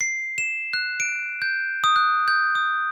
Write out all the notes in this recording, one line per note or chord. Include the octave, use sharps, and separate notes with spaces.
C7
E7
F#6
D7
G6
D#6
F#6
G6
D#6